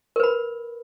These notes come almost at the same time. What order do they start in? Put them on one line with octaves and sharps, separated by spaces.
A#4 B4 B5